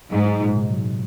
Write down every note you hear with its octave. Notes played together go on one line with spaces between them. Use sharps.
G#2 F#3
D#4
A#2
C3
F#3